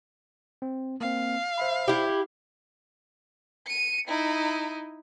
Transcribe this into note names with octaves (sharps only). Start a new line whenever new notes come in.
C4
A#3 C4 F5
C5 E5 B5
E4 G4
C#7 D#7
D#4 E4